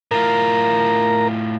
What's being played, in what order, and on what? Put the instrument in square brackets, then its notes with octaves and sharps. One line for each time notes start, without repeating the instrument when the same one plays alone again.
[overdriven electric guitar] A2 F4 [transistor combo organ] A#4 A#5